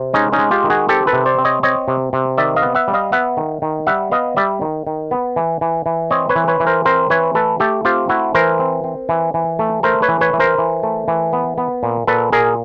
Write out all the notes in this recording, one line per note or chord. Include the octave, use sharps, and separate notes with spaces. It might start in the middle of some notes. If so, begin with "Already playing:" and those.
Already playing: C3 C4
G#3 C#4 D#4
C#4 D#4
G#3
F4 G4
D#3
F#4 G#4
C4 G4 A4
A4 B4
C3
C5 D5
C4
C#5 D#5
C4 C#5 D#5
C3
C3
D#3 D5 E5
D#5 F5
B3
E5 F#5
G3
D#5 F5
B3 E5 F#5
D#3
D#3
G3 E5 F#5
B3 D#5 F5
G3 D5 E5
D#3
D#3
B3
E3
E3
E3
C4 C#5 D#5
B4 C#5
E3
B4 C#5
E3
A#4 C5
C4 A#4 C5
E3 B4 C#5
A3 A4 B4
A3 G4 A4
C4 F4 G4
A3 E4 F#4
E3 A#4 C5
C4
C4
E3
E3
A3
A3 A#4 C5
B4 C#5
E3
B4 C#5
E3
A#4 C5
E3
A3
E3
B3
B3
A#2
A#2 A4 B4
A#2 G#4 A#4